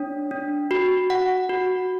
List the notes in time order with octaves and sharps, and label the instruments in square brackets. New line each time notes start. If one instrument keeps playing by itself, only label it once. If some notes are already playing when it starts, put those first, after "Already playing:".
Already playing: [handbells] D4 C#5
D4
F#4
F#5
F#4